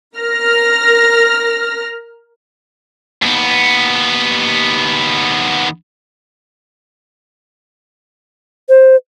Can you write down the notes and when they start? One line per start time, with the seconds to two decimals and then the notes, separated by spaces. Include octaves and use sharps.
0.17 A#4 F6 A#6
3.22 D#2 B3
8.69 C5